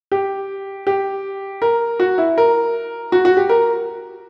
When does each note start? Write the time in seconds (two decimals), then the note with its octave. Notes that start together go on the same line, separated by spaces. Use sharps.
0.12 G4
0.87 G4
1.62 A#4
2.00 F#4
2.18 E4
2.38 A#4
3.12 F#4
3.25 F#4
3.37 G4
3.49 A#4